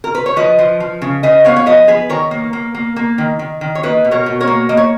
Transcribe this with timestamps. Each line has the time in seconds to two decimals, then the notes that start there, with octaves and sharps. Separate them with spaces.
0.04 A#4
0.15 B4
0.26 C#5
0.36 F3 B4 D#5
0.59 F3
0.80 F3
1.02 C#3
1.23 C#3 B4 D#5
1.45 B3 C#5 F5
1.56 C#5
1.66 F3 B4 D#5
1.88 B3 G#4 B4
2.09 D#3 A#4 C#5
2.31 A#3
2.53 A#3
2.75 A#3
2.96 A#3
3.18 D#3
3.39 D#3
3.61 D#3
3.75 C#5
3.83 A#3 B4 D#5
4.05 B2
4.11 A#4 C#5
4.26 B2
4.41 A#4 C#5
4.47 A#3
4.69 A#3 D#5
4.77 C#5